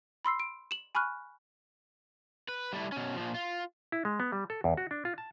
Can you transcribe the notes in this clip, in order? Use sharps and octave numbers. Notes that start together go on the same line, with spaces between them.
B5 C6 E6 C7
D7
E7 F#7
G#5 B5 C#6 F6 F#6
B4
G3 A3 E4
B2 C#4
A#2 F3
F4
E4
G#3
B3
G3
A4
E2
F#4
D4
F4
A5